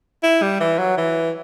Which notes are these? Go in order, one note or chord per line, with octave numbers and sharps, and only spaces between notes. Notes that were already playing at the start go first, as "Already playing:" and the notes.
E4
G3
E3
F#3
E3